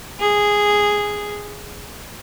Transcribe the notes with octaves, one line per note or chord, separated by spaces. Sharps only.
G#4